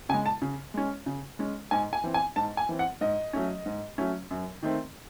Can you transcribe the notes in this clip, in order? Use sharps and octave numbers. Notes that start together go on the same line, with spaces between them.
C#3 G#3 G#5
A5
C#3
G#3 C#4
C#3
G#3 C#4
G#2 G#5
G#5
E3 C4
G#5
G#2 A5
G#5
E3 C4
F#5
G#2 D#5
F#3 A3 C#4
G#2
F#3 A3 C#4
F#2
D#3 A3 C4